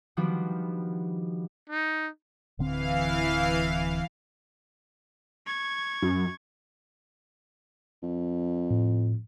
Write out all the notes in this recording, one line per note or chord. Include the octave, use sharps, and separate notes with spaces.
D#3 F3 G3 B3 D4 F#4
D#4
D1 D3 E3 C4 F5
C#6 G#6
F#2
F2
A2